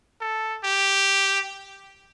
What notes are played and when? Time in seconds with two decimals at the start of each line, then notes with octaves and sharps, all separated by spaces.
0.21 A4
0.64 G4